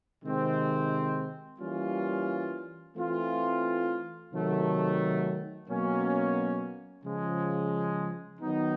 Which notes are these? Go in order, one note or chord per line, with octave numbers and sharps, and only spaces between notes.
C3 D#3 G#3 C4
E3 G3 A#3 C#4 F4
E3 A3 C4 F4
C3 D#3 F#3 A3
B2 F#3 A#3 C#4
C#3 F3 G#3
D#3 F#3 B3 D#4